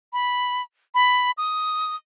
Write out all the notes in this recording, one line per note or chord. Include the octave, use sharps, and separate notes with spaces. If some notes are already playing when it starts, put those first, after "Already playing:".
B5
B5
D#6